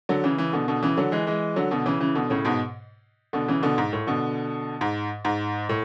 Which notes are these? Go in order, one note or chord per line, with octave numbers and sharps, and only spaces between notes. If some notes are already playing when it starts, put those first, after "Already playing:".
D3 F#3
C#3 E3
C#3 E3
B2 D3
B2 D3
C#3 E3
D3 F#3
E3 G#3
E3 G#3
D3 F#3
B2 D3
C#3 E3
C#3 E3
B2 D3
A2 C#3
G#2 B2
B2 D3
C#3 E3
B2 D3
G#2
A2
B2 D3
G#2
G#2
A2